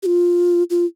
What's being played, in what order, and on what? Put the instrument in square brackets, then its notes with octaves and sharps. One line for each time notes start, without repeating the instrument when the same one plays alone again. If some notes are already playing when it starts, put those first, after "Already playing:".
[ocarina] G4
F4
F4